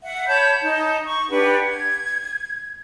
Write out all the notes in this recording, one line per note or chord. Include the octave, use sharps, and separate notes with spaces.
E5 F#5
C#5 A5 B5 G6
D#4 A5
C#6
D4 G4 B4 F#5
G#6